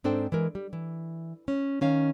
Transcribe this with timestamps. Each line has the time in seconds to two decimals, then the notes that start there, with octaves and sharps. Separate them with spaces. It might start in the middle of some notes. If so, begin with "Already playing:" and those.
0.04 G#2 C4 D4 A4 C5 G5
0.32 E3 G#3 A#4
0.55 G3
0.73 E3
1.48 C#4
1.81 D#3 C#4 F5